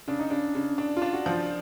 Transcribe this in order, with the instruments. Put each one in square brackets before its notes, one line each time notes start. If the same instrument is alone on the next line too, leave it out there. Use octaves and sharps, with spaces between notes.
[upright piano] C#3 [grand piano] D4
[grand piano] D#4
[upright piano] C#3 [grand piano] D4
[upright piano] C#3
D4
[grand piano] F4
[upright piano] D4
[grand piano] F#4
[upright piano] F3 [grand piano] F4